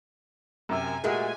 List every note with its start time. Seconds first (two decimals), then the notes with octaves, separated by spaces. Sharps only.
0.69 F#2 C3 A#4 G#5 E6
1.04 A#2 G#3 A3 F#4 G4 A#4 G#5